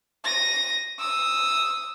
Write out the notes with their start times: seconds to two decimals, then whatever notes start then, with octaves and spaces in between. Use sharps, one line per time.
0.25 A#6 D#7
0.99 D#6 E6